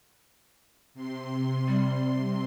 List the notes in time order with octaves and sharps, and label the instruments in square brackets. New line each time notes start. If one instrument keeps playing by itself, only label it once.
[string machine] C3 C6
[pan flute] G3